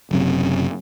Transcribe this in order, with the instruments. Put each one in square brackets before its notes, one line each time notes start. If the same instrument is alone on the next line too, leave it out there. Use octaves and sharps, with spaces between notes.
[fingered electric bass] F#1 F#2 C3